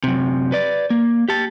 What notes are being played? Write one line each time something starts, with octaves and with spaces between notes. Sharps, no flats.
F#2 C3
B4 D5
A#3
G4 A5